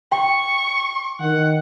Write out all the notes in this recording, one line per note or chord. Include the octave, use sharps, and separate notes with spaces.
G5 C#6
D#3 F#5